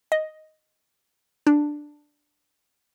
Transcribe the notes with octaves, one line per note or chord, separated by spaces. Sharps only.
D#5
D4